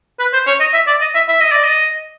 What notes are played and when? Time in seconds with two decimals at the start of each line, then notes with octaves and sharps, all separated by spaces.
0.19 B4
0.33 C5
0.47 C#5
0.60 D#5
0.73 E5
0.87 D5
1.01 D#5
1.15 E5
1.28 E5
1.41 D#5
1.52 D5
1.64 D#5